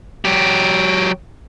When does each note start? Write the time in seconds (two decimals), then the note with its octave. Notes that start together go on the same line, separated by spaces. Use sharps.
0.25 F#3 G4